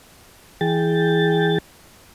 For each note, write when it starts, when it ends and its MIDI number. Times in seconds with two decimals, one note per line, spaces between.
0.61 1.58 52
0.61 1.58 68
0.61 1.58 79
0.61 1.58 93